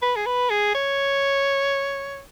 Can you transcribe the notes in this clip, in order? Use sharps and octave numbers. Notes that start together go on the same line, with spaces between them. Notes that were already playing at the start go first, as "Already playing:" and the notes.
B4
G#4
B4
G#4
C#5